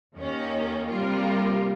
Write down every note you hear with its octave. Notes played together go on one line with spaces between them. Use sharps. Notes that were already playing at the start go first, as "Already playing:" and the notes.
D#2 D#3 A#3 C#4
C3 G3 A#3 F4 A#4